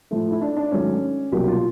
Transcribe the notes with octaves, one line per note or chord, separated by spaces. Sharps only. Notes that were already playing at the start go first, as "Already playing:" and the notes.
A2 F3 A3
E4
D4
D4
G#2 D#3 F#3 A3 C#4
C2 B2 F#3 A#3 G4
F4